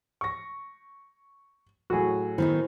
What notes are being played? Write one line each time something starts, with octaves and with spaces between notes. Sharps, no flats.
C#6 A#6
A2 F#3 F#4 G#4
D#3 B3 D#4 E4 C5